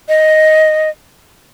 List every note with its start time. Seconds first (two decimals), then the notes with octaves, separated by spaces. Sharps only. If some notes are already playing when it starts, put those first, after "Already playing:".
0.09 D#5